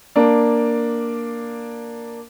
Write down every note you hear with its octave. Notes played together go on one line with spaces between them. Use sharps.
A#3 D4